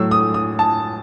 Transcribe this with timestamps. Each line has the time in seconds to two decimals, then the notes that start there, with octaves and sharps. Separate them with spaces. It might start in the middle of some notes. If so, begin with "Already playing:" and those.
Already playing: A2 F#3 E6
0.11 D#6
0.34 D#6
0.59 A5